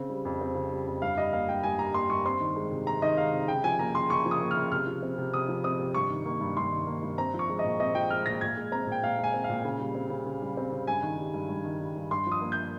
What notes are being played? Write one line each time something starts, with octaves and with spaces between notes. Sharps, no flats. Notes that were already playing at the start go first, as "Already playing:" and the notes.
Already playing: C#3 C4
G3
F2
C4
C#3
G3
F2
G2 F5
G3 D#5
A#3 F5
G2 G5
G2 G#5
G3 A#5
A#3 C6
G2 C#6
C4 C6
D#3
G#3
C3
C4 A#5
D#3 D#5
G#3 F5
C3
C#3 G5
F3 G#5
A#3 A#5
C#3 C6
C#3 C#6
F3
D#6
A#3
F6
C#3
C3 F6
F3
C4
C3
C3 D#6
F3
C4 D#6
C3
G2 C#6
D#3
A#3
G2
G2 C6
D#3
A#3
G2
C4 A#5
F3
C#6
G#3
D#5
A#2
C4 D#5
F3 G5
G#3 F6
A#2 A#6
A#2 G#6
G#3
C4 A#5
A#2 G5
A#2 F5
G#3
G#5
C4
F5
A#2
C#3
G3
C4
C#3
C#3
G3
C4
C#3
G2 G#5
D#3
G3
G2
G2
D#3
G3
G2
G2 C6
F3
D#6
A#3
G6